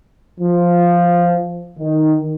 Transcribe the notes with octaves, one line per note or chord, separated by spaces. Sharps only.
F3
D#3